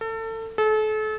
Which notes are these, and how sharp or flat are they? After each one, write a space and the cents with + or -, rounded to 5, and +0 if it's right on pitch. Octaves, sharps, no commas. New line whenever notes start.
A4 +30
A4 -35